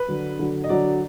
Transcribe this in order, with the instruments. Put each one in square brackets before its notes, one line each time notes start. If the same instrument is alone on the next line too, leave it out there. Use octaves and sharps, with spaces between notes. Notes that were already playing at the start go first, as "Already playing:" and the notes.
Already playing: [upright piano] B4
[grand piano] D3 F#3 D4
D3 F#3 D4
[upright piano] D#5
[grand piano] D3 F#3 D4 [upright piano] D5